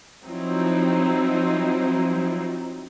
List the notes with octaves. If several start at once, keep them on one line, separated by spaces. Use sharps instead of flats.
F3 F#3 C4 D#4 E4